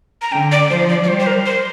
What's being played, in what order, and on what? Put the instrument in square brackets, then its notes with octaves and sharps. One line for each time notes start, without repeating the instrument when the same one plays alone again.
[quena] A#5
[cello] D3 [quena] G5
[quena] D5
[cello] F3 [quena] C5
[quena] D5
D5
[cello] G3 [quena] C5
[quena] C5
A#4
C5